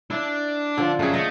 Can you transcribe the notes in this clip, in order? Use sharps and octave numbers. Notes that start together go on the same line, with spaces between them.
D4 E4
D3 F3
F#2 A3 G#4
A3 D#5